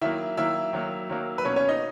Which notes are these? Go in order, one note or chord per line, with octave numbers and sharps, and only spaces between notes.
D#3 F#3 A#3 E4 E5
D#3 F#3 A#3 E4 E5
D#3 F#3 A#3
D#3 F#3 A#3
B4
B2 A#3 C#4 C#5
C#4 C#5
D#4 D#5